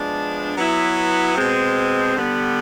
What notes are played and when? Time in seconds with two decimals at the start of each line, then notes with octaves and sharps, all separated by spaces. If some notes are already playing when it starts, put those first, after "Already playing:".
Already playing: F3 G#3 B3 D4
0.56 F#3 B3 E4
1.36 B2 G#3 C4
2.15 D3 G3 B3